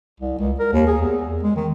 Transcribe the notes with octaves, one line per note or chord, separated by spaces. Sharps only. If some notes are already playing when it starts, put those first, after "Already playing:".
C2
C#2
A#4
D#2
G#4
E2
G#3
D#3